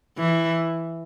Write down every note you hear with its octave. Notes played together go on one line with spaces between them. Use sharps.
E3